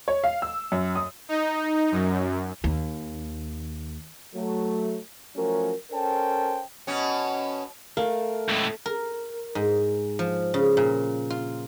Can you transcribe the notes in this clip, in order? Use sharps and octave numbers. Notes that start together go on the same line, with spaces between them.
C#5
F5
E6
F#2
D#6
D#4
F#2
D#2
F#3 A3
F3 F#3 A3 C#4 A#4
C#4 A4 A#4 C5 G5 A5
B2 C#4
A3 A#4 F5
C#2 A2
A#4
G#2
F3
C#3
A#2
F4